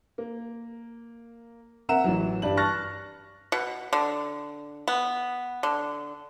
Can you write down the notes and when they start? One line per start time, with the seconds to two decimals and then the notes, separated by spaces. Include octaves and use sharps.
0.18 A#3
1.89 C4 A#4 E5 F#5 A#5 E7
2.04 A1 E3 F#3
2.42 G2 G3 F#7
2.57 A5 C#6 F6 F#6 A6 A#6
3.52 B2
3.93 D3
4.88 B3
5.63 D3